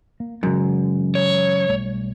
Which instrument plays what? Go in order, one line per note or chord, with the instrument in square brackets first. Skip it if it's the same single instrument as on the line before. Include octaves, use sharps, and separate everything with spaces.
[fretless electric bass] A#3
[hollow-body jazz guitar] F#2 [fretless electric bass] C#3 E3 G#3
[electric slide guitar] C#5
[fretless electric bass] B1 G3 A3